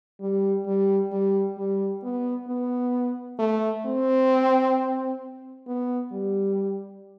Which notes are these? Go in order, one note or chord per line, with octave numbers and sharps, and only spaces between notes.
G3
G3
G3
G3
B3
B3
A3
C4
B3
G3